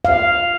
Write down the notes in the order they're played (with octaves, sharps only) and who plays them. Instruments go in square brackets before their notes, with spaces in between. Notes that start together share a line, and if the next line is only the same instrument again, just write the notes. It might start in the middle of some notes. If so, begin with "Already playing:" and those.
[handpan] F5